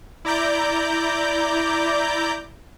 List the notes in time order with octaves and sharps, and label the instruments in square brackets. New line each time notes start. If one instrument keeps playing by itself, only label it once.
[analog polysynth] E4 D5 A#5 D6 G6